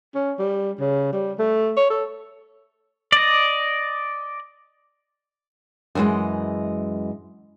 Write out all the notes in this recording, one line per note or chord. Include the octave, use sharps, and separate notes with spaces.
C#4
G3
C#3
G3
A3
C#5
A4
D5 D#5
F#2 D#3 E3 G#3 D#5